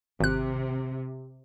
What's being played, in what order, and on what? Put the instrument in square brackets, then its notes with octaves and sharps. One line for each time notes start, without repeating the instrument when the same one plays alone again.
[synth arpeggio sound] G#1 F#6 [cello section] C3